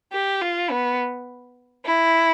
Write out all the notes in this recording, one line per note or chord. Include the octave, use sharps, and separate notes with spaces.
G4
F4
B3
E4